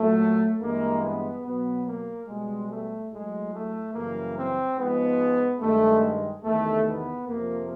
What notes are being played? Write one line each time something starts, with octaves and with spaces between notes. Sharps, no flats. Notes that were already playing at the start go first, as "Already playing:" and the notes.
Already playing: A#2 F#3 A3
G2 E3 G#3 A#3
B3
B2 F#3 B3
A#3
B2 G3 G#3
A3
A2 F#3 G#3
A3
F#2 C#3 E3 G3 A#3
C4
G#2 F3 G#3 B3
G2 D#3 G#3 A3
E2 C3 D#3 A3
B3
F2 C3 F3 A#3